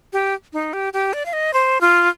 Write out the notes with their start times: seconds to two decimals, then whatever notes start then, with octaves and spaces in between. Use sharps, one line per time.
0.13 G4
0.53 D#4
0.73 G4
0.93 G4
1.13 D5
1.26 F5
1.33 D#5
1.54 C5
1.81 F4